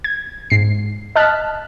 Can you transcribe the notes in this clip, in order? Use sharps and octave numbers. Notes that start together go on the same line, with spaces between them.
G#6
G#2 C7
D#5 A5 F6 F#6 A6 B6